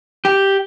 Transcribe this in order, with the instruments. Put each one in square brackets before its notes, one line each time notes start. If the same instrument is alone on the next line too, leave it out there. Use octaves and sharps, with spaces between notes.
[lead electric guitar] G4